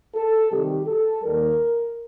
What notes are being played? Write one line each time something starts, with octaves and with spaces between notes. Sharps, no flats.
A4
C3 D#3 G3 G4
A4
D#2 D#3 G3 A#4